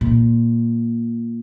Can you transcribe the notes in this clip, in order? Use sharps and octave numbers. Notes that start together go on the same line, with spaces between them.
A#2